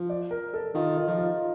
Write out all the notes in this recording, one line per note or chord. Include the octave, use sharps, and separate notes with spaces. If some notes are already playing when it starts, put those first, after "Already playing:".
Already playing: F3
D5
A#4
A4
D#3 F4
D#4
F3
F4